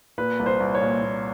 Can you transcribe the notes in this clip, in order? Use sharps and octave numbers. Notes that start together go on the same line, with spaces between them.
A#2 B4
C2
C5
C2
C#5
A#2
A#2